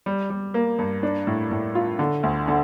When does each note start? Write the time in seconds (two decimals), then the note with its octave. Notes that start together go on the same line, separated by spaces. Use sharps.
0.06 G3
0.30 G3
0.54 A#3
0.78 G2
1.03 D4
1.27 A2
1.51 A2
1.75 F4
1.99 D3
2.23 D2
2.48 D3